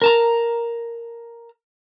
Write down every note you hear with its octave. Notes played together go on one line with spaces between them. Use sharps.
A#4 A5 A#5